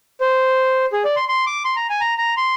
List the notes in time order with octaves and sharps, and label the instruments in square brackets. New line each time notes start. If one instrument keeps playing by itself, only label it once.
[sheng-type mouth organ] C5
G#4
D5
C6
C6
D6
C6
A#5
G#5
A#5
A#5
C6